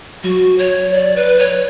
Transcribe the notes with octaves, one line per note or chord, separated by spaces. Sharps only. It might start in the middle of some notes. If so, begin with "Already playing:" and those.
F#3 F#4
C#5
D5
B4
C#5